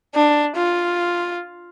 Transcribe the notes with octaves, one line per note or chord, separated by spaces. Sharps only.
D4
F4